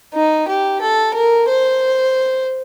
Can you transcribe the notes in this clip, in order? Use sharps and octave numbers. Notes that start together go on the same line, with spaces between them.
D#4
G4
A4
A#4
C5